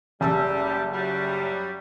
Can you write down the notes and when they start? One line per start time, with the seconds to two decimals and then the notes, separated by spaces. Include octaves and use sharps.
0.21 F#1 G3 A5 E6
0.93 F#3 G3